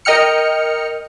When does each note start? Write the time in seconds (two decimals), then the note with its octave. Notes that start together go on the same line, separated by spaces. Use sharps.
0.05 A#4 D#5 G5 F6 C#7